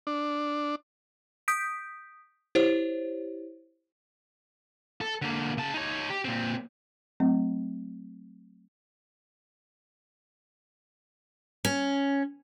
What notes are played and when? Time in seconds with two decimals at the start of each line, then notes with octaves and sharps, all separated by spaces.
0.07 D4
1.48 D#6 G6 B6 D7
2.55 E4 G4 C5 C#5
5.01 A4
5.22 D3 A#3
5.58 C#3 A5
5.74 D#4 C#5
6.10 G4
6.25 A#2 C4
7.20 F#3 A3 C4
11.65 C#4